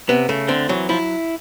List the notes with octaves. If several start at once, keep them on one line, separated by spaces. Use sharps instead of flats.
C3 B3
C#3 A3
D3 C4
E3 F#3
F3 E4